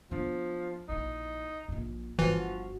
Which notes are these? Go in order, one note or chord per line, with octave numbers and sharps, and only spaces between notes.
F3 B3 D4
A#1 D#4 E4
D1 A#1
G1 E3 F3 F#4